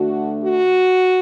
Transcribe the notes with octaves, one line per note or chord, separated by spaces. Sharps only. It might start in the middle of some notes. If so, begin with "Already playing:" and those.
Already playing: D2 D3 A3 D4 F#4
F#4